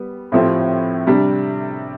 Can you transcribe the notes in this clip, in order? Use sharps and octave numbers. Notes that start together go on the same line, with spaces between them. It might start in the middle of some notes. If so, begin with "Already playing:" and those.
Already playing: G3 B3
A2 F3 C4 E4 G4
C3 G3 D4